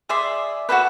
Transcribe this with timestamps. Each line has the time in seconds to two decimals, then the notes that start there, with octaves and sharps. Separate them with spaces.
0.09 G#4 D5 E5 C6
0.69 F#4 G#4 A4 B4